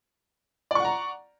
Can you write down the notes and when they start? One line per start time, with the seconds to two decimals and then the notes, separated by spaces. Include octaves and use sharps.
0.71 D5
0.75 C#6
0.80 F#5
0.85 A#5